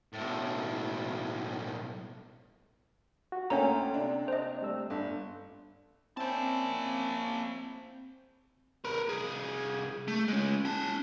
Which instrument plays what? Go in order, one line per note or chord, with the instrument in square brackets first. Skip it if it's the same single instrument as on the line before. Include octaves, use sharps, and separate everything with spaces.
[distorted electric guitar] B1 A2
[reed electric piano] F#4
[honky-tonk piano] D2 [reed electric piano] A#3 G5 [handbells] C#4 C#5 A#5
[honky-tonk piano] C3 D4
[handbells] C5 D#5
[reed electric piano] G3 A3 E6
[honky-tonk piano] G1 [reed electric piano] B3 D4
[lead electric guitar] A#3 A5 [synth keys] C4 G6 [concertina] C#4 E4
[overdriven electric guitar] A#4 B4
C2 G#4
A3
G#3 C#4
C#4 A5